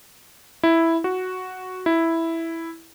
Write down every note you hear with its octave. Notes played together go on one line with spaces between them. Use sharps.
E4
F#4
E4